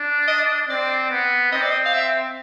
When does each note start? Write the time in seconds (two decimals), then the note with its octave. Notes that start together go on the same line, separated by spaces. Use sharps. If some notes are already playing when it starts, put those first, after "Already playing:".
Already playing: D4
0.27 D#5
0.69 C4 D5
1.11 B3
1.52 C4 D#5
1.62 D5
1.71 D#5
1.85 F5
1.93 E5